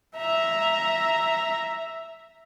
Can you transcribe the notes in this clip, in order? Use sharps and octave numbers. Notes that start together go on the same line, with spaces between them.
E5 A#5